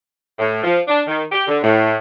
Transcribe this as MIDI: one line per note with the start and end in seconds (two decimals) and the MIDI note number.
0.39 0.59 45
0.63 0.80 53
0.87 1.01 62
1.08 1.24 51
1.32 1.44 67
1.47 1.57 50
1.63 1.95 45